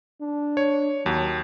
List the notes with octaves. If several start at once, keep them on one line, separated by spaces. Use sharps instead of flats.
D4
C#5
D#2 F#3